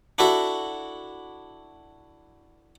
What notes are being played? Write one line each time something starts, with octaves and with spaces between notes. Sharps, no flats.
D4 E4 F#4 A4 E5